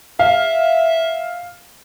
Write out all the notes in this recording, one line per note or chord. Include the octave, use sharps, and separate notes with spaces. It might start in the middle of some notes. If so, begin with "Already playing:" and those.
E5 F5